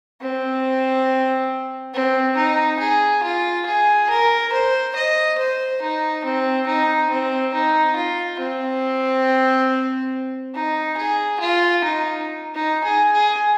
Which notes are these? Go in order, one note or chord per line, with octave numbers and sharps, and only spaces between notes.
C4
C4
D#4
G#4
F4
G#4
A#4
C5
D#5
C5
D#4
C4
D#4
C4
D#4
F4
C4
D#4
G#4
F4
D#4
D#4
G#4
G#4